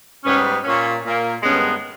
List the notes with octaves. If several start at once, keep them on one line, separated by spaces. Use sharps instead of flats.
G#2 G3 B3 C#4
A#2 A#3 C#4
A#2 A#3
G2 D#3 G#3 B3 C#4